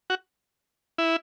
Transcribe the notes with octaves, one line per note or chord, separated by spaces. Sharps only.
F#4
E4